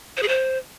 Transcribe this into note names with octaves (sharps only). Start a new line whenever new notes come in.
C5
G#4
C5